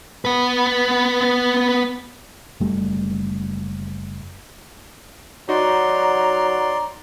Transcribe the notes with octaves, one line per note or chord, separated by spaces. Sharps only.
B3 B4
F#1 G3 A3
F#3 D#4 F#4 D5 A#5 C6